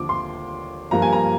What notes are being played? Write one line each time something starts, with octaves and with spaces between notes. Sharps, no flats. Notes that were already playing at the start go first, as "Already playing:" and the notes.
Already playing: D#2 D3 F3 D6
C6
G2 F3 A#3 A#5
G#5
A#5